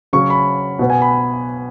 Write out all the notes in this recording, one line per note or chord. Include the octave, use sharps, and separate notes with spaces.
C#3 F#3 C#4 C#6
B5
B2 B3
G#5
B5